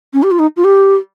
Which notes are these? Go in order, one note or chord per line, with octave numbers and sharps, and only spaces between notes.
C#4
G4
F4
D#4
F4
G4